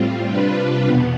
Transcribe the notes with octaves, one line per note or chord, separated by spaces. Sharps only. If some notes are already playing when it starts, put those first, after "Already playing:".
Already playing: A2 G3 C4 F4
C3 G3 D4 F4 B4
E2 B2 B3